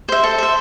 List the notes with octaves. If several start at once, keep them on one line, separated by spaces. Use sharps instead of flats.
C5 E5
A4
C5 E5